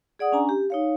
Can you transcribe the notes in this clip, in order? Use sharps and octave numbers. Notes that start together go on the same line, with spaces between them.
G#4 D5 F#5 D#6
C#4 D4 G#5 A#5
G4
D#4 C#5 F5